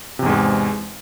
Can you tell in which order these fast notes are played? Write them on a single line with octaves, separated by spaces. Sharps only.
C3 E2 G#2 G#3